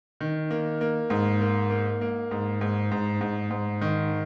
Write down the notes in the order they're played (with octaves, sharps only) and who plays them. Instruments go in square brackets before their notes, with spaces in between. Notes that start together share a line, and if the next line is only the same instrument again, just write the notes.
[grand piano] D#3
A#3
A#3
G#2
A#3
A#3
A#3
G#2
G#2
G#2
G#2
G#2
D#3